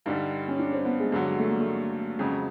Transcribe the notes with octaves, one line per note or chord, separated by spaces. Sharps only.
G2 D3 G3 D#4
C#4
D4
C4
B3
G#3
G2 D3 F#3 G#3
A3
A#3
A3
F2 C#3 F#3 G#3